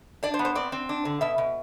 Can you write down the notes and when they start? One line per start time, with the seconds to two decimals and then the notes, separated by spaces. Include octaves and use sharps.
0.23 D4 D5
0.34 C5
0.39 B3
0.45 C5
0.55 C4 D5
0.72 C4
0.89 D4
1.05 D3
1.21 B2 E5
1.38 B2